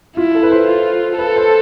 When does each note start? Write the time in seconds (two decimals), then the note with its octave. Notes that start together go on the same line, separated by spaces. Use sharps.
0.17 E4 F4
0.35 A4
0.43 B4
0.51 C5
0.68 F4
1.18 A4 B4
1.36 C5